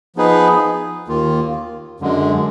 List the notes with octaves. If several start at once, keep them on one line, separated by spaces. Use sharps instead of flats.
F3 B3 D#4 G#4 B4
D#2 D#3 A#3 F4
F#2 D3 G#3